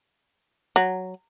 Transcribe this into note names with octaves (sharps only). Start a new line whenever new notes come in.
F#3